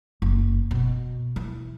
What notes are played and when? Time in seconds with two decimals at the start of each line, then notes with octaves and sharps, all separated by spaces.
0.22 F#1
0.71 B2
1.36 E3